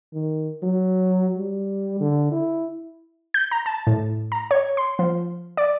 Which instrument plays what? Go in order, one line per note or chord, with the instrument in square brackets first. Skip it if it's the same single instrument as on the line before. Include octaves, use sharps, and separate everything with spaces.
[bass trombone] D#3
F#3
G3
D3
E4
[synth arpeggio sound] G6
A#5
A5
A2
A#5
C#5
C6
F3
D5